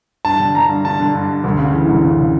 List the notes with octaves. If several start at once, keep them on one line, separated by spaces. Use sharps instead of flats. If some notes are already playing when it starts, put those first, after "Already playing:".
G2 A5
D3
D3 A#5
G2
D3 A5
D3
G2
G2
D2
C#3
E3
D2
C#3
C#3